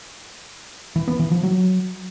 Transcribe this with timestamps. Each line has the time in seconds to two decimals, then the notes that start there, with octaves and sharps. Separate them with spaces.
0.96 E3
1.08 B3
1.20 E3
1.31 F3
1.43 F#3